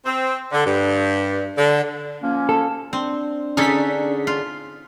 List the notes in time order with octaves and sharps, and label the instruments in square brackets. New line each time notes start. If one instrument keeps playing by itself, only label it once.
[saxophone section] C4
D3
G2
D3
[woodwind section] F3 A#3 C#4
[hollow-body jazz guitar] A4
[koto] C4 [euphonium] D4
[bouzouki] D3 G#4 [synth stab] C#4 B6 [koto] D#4 A4
[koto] F4